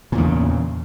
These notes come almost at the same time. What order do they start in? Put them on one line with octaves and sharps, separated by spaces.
A#2 E2 C#3